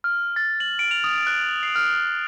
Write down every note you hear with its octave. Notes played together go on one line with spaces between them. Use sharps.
F6
A6
F#7
D7
F7
D#6
F#6
C7
F6